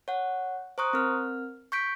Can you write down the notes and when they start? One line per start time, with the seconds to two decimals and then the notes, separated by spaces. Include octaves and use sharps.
0.08 C#5 F#5
0.78 C5 A#5 C#6 D#6 F#6
0.93 C4 A#4 F6
1.72 C#6 G6 B6 D7